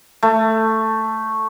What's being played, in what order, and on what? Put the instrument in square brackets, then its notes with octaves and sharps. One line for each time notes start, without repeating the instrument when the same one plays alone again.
[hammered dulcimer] A3